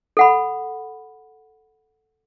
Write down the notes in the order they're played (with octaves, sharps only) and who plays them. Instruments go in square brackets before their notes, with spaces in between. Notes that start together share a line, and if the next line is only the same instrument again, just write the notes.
[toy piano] A4 F#5 B5